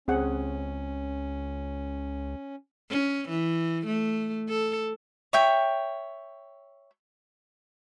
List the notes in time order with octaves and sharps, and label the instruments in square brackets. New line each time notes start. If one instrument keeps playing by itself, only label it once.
[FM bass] C#2 [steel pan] C4 G#4 F#5 [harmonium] C#4
[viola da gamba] C#4
E3
A3
A4
[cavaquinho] C#5 E5 G5